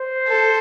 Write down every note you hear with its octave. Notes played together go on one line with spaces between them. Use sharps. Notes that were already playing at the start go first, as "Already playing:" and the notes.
Already playing: C5
A4